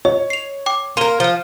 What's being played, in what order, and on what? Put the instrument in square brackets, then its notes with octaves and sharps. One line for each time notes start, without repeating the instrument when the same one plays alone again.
[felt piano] C#5 [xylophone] D#5
[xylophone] C7 F7
G5 D6
[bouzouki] A#3 A#4 [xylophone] C6 D#7 G7
[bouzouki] F3 [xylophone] F6 G7